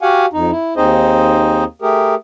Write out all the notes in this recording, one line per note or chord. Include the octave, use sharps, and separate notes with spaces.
F#4 G4 F5 F#5 G#5
F2 D#4
E4
D#2 C4 D#4 G#4 C5 D#5
A3 G4 G#4 A#4